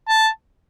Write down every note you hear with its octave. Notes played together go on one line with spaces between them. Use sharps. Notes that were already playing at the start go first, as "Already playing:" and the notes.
A5